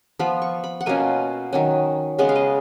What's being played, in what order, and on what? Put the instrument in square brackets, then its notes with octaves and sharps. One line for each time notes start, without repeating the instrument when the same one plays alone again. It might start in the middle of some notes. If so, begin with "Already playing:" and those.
[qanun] F3 B3 F4 B5
C#6
B5
F#5
B2 A#3 C#4 F4 G#5
D#3 F#3 C#4
C#3 G#3 B3 F#5
F5
D#5